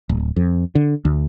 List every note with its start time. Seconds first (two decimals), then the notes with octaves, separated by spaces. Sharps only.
0.09 D1
0.36 F2
0.75 D3
1.05 D2